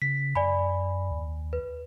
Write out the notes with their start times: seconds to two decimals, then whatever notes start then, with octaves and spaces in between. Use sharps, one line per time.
0.02 C#3 B6
0.35 F#2 D5 G#5 B5
1.11 D#2
1.53 B4